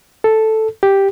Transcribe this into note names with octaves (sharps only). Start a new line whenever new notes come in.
A4
G4